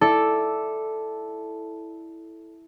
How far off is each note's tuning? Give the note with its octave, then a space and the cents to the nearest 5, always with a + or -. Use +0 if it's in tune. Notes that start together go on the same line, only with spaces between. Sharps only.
E4 -5 A4 -5 D5 +0